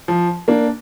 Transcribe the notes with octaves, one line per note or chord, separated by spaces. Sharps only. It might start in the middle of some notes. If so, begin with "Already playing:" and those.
F3
A#3 D4